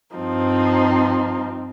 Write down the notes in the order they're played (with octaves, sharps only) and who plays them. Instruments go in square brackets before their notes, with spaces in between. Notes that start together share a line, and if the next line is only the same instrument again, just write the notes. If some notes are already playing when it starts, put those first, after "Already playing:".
[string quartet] G2 F3 C4 D#4